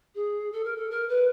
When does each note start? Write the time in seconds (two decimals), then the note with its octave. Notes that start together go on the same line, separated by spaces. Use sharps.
0.15 G#4
0.52 A4
0.64 A#4
0.76 A4
0.90 A#4
1.09 B4